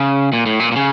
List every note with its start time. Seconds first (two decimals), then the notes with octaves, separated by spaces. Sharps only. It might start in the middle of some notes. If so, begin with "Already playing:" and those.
Already playing: C#3
0.33 A#2
0.46 A2
0.60 A#2
0.72 A#2
0.76 C#3